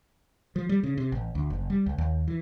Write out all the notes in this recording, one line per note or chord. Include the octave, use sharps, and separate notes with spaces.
F3
G3
C#3
C3
A1
D2
F#1
G3
C#2
D#2
E3